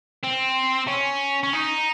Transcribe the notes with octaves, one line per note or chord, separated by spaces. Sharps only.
C4
C#4
C#4
D#4